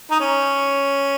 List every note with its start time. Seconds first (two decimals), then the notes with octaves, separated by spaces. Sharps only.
0.11 D#4
0.20 C#4